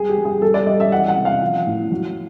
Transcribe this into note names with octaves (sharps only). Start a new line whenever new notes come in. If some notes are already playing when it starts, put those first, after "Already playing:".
Already playing: G3 G#4
G4
G3
G#4
G3 A4
D5
G3 D#5
E5
E3 F#5
F#5
C3
F5
F3
A2
F#3